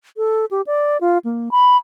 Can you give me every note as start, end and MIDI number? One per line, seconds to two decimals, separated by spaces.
0.17 0.45 69
0.51 0.61 67
0.66 0.97 74
1.01 1.18 65
1.24 1.49 58
1.51 1.77 83